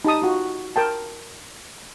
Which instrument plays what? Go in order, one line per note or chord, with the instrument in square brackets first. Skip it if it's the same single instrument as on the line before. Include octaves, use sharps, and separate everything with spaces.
[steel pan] D#4 G4 A5 D#6
F4 F#4
A#4 G5 A5